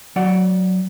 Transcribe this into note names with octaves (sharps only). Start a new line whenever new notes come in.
F#3 D5 F#5